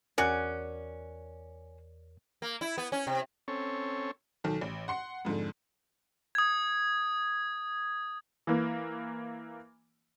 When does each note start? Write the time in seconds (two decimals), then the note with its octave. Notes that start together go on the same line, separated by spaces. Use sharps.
0.18 E2 C#4 F#4 G#4 A#4 D5 F#6
2.42 A#3
2.61 E4
2.78 B3
2.92 C#4
3.07 C3
3.48 C4 C#4 A4 C#5
4.44 B1 D#3 A4
4.61 A1
4.88 F#5 C6 C#7
5.25 F2 G#2 D3
6.35 D#6 G#6
8.47 E3 A#3